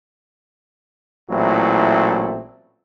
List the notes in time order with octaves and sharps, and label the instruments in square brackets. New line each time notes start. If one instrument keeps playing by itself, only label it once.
[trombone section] A1 A#2 F#3 A3 C4 E4